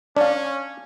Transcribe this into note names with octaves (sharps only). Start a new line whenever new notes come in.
C#4 D4 D5 F5